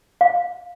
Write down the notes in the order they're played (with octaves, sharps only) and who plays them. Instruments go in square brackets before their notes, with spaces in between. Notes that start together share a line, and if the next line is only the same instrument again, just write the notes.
[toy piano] F5